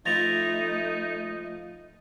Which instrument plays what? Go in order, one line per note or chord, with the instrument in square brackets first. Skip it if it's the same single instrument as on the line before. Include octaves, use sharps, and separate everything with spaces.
[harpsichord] F3 E4 [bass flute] A3 [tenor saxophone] D#4 [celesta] A6 A#6 F7